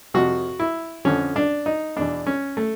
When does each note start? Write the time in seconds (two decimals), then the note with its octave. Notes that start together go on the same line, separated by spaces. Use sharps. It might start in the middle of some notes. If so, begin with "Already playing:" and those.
0.14 F2 C3 F3 F#4
0.60 E4
1.05 F2 D3 F3 C#4
1.36 D4
1.66 D#4
1.96 E2 B2 D4
2.27 C#4
2.57 A3